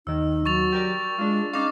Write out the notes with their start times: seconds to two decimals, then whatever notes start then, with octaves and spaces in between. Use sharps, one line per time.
0.07 D#2 D#3 D#4 E6
0.46 F#3 C#6 A6 F7
0.72 G4 A#4 D5
1.18 G#3 D4 F4
1.53 C#4 D#4 F5 C#6 D6